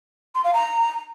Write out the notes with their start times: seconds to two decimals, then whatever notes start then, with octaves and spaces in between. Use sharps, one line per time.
0.35 C6
0.44 F5
0.54 A#5